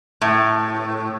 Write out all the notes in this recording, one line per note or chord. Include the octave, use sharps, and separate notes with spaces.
A2